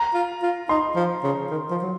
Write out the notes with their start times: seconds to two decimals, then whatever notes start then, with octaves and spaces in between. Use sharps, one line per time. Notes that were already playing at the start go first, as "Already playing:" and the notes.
Already playing: A#5
0.14 F4
0.42 F4
0.69 D#4 C6
0.96 F3
1.24 C#3
1.51 D#3
1.71 F3
1.82 F#3